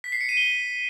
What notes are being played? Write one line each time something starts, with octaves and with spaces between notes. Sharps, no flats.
B6
C7
C#7
D#7
G7